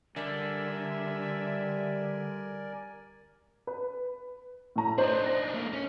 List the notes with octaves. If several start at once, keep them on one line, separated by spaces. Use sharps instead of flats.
D3 G3 A#4 D5 E5 G#5
B4
A2 A#5
D4 D#4 C5
A#6
A3 A#3
C#4